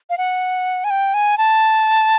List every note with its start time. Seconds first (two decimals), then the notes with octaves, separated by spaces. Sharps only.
0.10 F5
0.18 F#5
0.84 G#5
0.90 G5
1.14 G#5
1.38 A5